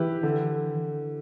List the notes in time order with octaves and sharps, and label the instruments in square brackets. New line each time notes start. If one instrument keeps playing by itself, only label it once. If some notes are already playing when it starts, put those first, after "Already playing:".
Already playing: [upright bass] E3 [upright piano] E4 G4 B4
[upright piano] D3